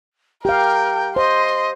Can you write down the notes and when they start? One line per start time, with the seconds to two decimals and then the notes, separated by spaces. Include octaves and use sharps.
0.45 G4 A#4 F5 G5
1.16 C5 D#5 C6